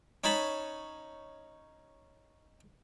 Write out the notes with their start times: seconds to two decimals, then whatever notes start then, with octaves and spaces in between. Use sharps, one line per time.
0.24 C#4 D#4 C#5 A5 B5